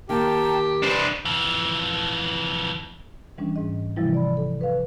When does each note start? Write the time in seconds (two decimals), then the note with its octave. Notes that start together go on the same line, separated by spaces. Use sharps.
0.09 D#3 A#3 G4 G5 A5 A#5
0.83 D4 B4 C5
1.25 F2 E3
3.38 E3 G3 C#4 D4
3.56 G#2 D#5
3.96 C3 E3 F3 G3 E4
4.14 D5 B5
4.37 A4
4.61 B4 F5